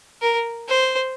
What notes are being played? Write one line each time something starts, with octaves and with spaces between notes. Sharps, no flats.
A#4
C5